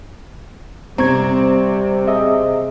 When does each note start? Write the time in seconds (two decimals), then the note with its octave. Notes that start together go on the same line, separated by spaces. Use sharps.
0.98 C3 G3 C4 A#5 C#6 G#6
2.08 G#4 D#5 E5